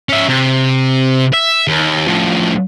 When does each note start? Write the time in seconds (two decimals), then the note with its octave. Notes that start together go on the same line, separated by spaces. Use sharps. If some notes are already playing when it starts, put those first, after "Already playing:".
0.09 C#4 E5
0.29 C3
1.33 E5
1.67 D#2
2.08 A2 F3